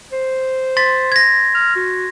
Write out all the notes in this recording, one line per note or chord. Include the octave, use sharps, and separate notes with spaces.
C5
C6 A6 B6
G#6 A#6
F6
F#4